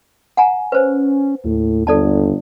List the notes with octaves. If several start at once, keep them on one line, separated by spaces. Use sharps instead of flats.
F#5 G#5 A#5
C#4 B4 C5
D#2 A2
G1 A4 D5 A5